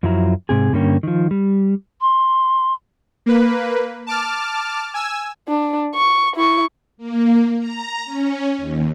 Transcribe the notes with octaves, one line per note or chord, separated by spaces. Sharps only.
F#2 F3 F#3 E4 A#5
G#2 C3 G#4
G2 D3 G3 A#3 C#4 G4
D#3 F3
G3
C6
A#3 B4
A5 D6 F6
G#5 E6
D4
C#6
E4 C#6
A#3
A#5
C#4
D#2